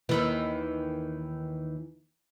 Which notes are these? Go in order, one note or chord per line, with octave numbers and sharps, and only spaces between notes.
D#2 D#3 E3